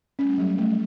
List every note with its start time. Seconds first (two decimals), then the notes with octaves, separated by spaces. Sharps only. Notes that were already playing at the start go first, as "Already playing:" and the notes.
0.18 G3 A3 C#4
0.38 F#3
0.58 A3